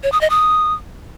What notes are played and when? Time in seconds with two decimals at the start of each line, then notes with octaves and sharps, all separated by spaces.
0.03 C#5
0.12 D#6
0.21 D#5
0.30 D#6